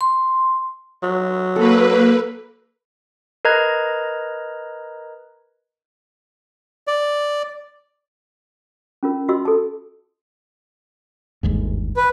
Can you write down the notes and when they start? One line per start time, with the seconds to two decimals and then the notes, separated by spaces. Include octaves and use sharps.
0.01 C6
1.03 F#3
1.56 A#3 A4 B4
3.45 A#4 B4 D#5 A#5 G#6
6.87 D5
9.03 C#4 F4 A#4
9.29 F4 F#4 D#5 C6 E6
9.45 A4 A5
11.43 G1 D#2 G#2
11.97 B4